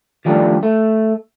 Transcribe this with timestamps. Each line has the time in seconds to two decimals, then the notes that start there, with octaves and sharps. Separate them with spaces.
0.25 D#3 F3 G3 A3 D4
0.63 A3